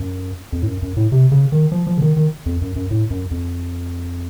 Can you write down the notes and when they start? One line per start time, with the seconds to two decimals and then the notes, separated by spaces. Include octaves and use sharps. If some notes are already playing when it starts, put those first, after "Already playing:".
Already playing: F#2
0.52 F2
0.62 A2
0.67 F#2
0.82 F#2
0.97 A2
1.12 C3
1.32 C#3
1.52 D#3
1.72 F3
1.87 F3
1.97 C#3
2.02 D#3
2.17 D#3
2.46 F2
2.62 F#2
2.76 F#2
2.91 A2
3.10 F#2
3.31 F2